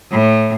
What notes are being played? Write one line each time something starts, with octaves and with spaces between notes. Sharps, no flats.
A2